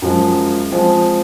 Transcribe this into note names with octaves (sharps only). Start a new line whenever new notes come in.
F#2 F3 G#3
F3 G#3 C4